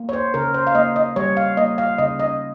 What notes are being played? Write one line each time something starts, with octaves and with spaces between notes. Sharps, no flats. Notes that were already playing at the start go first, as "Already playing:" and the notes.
Already playing: A#3
C#5
C5
C#3 A#4
C5
F5
A#3 D#5
D#5
G3 C#5
F5
A#3 D#5
F5
C#3 D#5
D#5